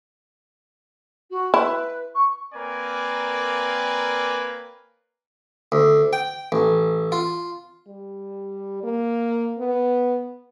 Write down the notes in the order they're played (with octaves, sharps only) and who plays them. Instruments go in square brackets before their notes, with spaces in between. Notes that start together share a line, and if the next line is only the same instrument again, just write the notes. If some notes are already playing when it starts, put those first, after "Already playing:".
[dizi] F#4
[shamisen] E4 [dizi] B4
[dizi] C#6
[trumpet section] A#3 C4 A#4 B4 D5 G#5
[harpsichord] D2
G5
A1
F4
[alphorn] G3
A#3
B3